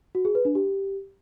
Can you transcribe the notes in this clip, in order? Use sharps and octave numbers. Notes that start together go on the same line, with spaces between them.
F#4
G#4
B4
D4
G4